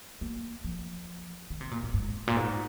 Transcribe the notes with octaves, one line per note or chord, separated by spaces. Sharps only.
A#3
F3
D#3
C3
A#2
G#2
G#2
A#2
G#2